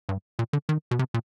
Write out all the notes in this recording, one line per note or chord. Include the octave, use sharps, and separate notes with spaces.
G2
A#2
D3
D#3
B2
C3
A#2